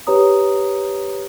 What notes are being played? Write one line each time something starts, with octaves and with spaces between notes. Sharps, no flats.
G4 B4 C#5 A#5 D#6